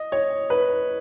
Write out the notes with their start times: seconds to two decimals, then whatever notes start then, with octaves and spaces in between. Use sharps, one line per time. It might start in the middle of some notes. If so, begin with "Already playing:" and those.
Already playing: D#5
0.12 C#5
0.50 B4